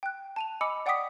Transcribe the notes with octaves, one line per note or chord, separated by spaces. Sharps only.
G5 F#6
A5 D#7 F7
D#5 G#5 B5 D6 E6 C#7
D5 F#5 G5 D6 D#6 B6